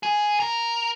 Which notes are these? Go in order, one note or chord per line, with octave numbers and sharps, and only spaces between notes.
G#4
A#4